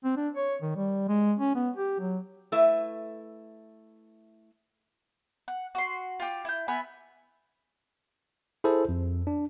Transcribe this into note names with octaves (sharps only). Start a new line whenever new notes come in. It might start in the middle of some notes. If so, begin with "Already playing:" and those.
C4
D4
C#5
D#3
G3
G#3
C#4
B3
G4
F#3
A3 E4 B4 E5
F#5
F#4 C6
F4 G4
E4 G6
B3 E5 G#5 B5
E4 G#4 A4 C5
F2
D4